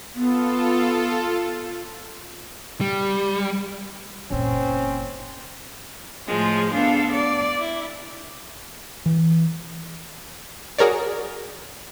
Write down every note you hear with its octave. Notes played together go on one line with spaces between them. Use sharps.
B3 F4 A4
G3
F#1 A#2 C4 C#4
A2 F3 G#3 F4
B3 D4 A4 F5
D5
E4
E3
F#4 G#4 A#4 C#5 D5